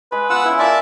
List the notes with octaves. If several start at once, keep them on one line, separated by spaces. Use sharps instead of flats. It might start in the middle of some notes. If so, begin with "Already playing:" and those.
G#3 B4
B3 F4 F#5 E6
C#4 E4 G#5
F4 A#4 D5 E5 A5